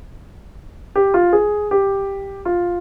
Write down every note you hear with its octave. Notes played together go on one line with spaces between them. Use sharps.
G4
F4
G#4
G4
F4